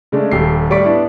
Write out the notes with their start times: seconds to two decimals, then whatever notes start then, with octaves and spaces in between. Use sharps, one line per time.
0.12 C#3 G#3 A3 D4
0.31 D#1 G4 A4 C7
0.70 A2 G3 D5 C#6 B6 D7
0.84 B3 D4 E4